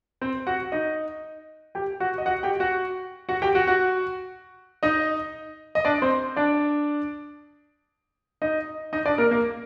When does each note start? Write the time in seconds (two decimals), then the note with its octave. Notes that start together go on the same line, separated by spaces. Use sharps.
0.22 C4 C5
0.47 F#4 F#5
0.72 D#4 D#5
1.75 G4 G5
2.00 F#4 F#5
2.18 D#5
2.26 F#4 F#5
2.43 G4 G5
2.60 F#4 F#5
3.29 F#4 F#5
3.42 G4 G5
3.55 F#4 F#5
3.67 F#4 F#5
4.83 D#4 D#5
5.75 D#5
5.85 D4 D5
6.02 C4 C5
6.36 D4 D5
8.42 D#4 D#5
8.93 D#4 D#5
9.05 D4 D5
9.18 A#3 A#4
9.31 A#3 A#4